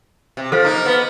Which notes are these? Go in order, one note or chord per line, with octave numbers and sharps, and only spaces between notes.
C3
F3 A4 C5 F5
A#3 D#4
B3